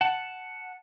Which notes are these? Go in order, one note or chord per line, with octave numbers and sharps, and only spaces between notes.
F#5 A5